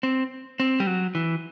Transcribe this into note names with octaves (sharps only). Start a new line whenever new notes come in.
C4
C4
G3
F#3
E3